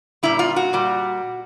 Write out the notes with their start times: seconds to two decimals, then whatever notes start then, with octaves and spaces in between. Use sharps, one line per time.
0.23 A#2 G3 E4
0.39 F4
0.56 F#4
0.73 A#2 G3